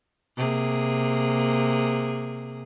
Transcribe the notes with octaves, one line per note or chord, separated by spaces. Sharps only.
C3 A#3 G#4